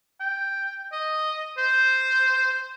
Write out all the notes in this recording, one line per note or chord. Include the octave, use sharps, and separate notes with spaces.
G5
D#5
C5